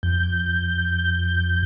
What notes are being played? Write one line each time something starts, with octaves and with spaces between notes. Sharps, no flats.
F2 G6